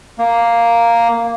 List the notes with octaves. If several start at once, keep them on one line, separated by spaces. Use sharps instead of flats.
A#3